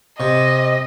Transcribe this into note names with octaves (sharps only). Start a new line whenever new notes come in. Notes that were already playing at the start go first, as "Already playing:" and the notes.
C3 D#5